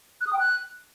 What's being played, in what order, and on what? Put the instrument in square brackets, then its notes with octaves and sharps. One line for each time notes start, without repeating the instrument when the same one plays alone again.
[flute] F#6
D#6
G5
F#6